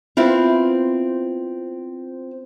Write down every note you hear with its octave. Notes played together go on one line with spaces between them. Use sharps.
B3 C4 E4 F4